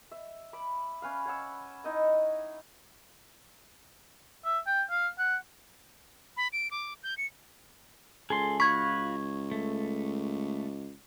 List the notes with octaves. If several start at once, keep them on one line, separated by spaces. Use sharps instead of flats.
E5
B5 D6
C#4 B4 F5
C#5 F#5 E6
D#4 E4 D#5 E5
E5
G5
F5
F#5
B5
D7
D6
G6
C#7
C#2 G#4 A4 C6
F4 F#4 B5 C#6 G#6
A3